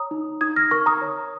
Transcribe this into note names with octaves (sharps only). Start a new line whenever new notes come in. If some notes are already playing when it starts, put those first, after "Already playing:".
Already playing: C#5 A#5 D#6
D#4
D#4 D#6 G#6
F6 A#6
A#4 C#6 F6
A#5 D#6
C#5